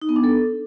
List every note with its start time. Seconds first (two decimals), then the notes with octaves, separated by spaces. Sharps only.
0.02 D#4
0.09 B3
0.16 D4
0.24 A4